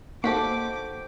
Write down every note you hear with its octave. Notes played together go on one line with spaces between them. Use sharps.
A#3 D#4 F#4 G4 A4 C5 D6 B6